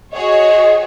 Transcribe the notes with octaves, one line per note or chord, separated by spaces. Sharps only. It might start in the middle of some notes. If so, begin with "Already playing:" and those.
F#4 G#4 C#5 D#5